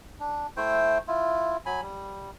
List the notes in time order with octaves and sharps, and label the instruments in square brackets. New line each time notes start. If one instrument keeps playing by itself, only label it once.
[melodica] D4
A3 E4 C5 G5
E4 F4
F#3 G#5 B5
G3